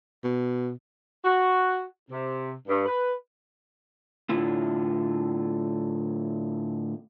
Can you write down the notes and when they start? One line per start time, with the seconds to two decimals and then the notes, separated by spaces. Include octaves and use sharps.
0.24 B2
1.25 F#4
2.10 C3
2.68 G2
2.86 B4
4.29 A2 D3 E4 F4